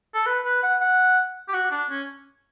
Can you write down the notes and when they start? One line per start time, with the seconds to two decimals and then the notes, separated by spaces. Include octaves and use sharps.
0.14 A4
0.26 B4
0.45 B4
0.63 F#5
0.81 F#5
1.49 G4
1.54 F#4
1.71 D4
1.90 C#4